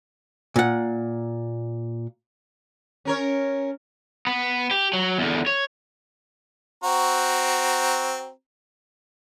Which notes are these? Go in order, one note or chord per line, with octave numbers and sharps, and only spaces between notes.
A#2 F#5
C#4 A#4 C#5
B3
G4
F#3
E2 D3
C#5
C4 F#4 A#5